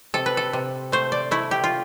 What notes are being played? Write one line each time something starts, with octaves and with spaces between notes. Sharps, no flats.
C3 A4
B4
A4
C3
A3 C5
D5
A3 E4
G4
F4